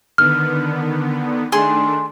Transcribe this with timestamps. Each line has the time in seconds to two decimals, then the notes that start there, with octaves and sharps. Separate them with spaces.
0.18 D3 D#3 B3 F6
1.52 D#3 A3 D4 G#4 C6